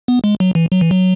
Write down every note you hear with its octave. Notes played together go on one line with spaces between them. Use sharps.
B3
G#3
F#3
E3
F#3
E3
F#3